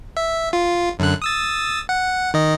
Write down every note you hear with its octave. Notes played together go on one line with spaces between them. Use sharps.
E5
F4
F#2 D3 F#6
D#6 E6 A6
F#5
D#3 D#5